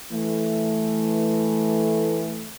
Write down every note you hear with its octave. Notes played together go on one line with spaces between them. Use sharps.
E3 A3